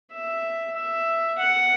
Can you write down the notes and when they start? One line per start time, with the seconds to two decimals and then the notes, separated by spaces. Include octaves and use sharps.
0.13 E5
0.76 E5
1.38 F#5